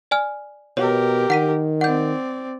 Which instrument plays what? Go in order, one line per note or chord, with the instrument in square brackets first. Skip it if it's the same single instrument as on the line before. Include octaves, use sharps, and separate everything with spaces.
[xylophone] D5 G#5 F6
[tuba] B2 [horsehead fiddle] G4 A#4 [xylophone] C#5
[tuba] D#3 [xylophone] F#5 B6 D#7
[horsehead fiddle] C4 D5 [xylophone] F#5 G6